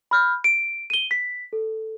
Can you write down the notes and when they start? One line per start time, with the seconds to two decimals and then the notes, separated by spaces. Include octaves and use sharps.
0.11 B5 F6 G6
0.44 D7
0.90 D#7 G7
1.11 B6
1.53 A4